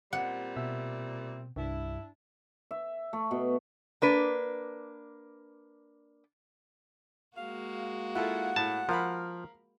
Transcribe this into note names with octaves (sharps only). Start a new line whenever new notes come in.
A#2 G3 C4 F#5
B2 E5 E6
C2 G2 D4 E4
E5
A3
B2
A#3 D4 B4
G#3 A#3 F#4 F5
E4 F4 A4 F#5
A2 A5
F3 A#4 F5 B5